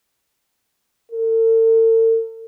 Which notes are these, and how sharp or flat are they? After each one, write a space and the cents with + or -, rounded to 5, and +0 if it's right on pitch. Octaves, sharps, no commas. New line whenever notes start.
A4 +45